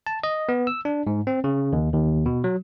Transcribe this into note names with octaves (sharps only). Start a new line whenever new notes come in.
A5
D#5
B3
E6
D4
G#2
C4
C#3
D#2
D#2
B2
F#3